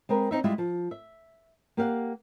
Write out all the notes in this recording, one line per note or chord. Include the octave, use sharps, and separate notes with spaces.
G#3 C4 A#4 B4
C4 D#4 E5
G3 G#3 E4 F4 E5
F3
E5
A#3 G4 F5 F#5